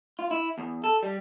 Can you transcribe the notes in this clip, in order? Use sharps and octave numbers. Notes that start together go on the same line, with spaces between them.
F4
E4
E2
A4
G3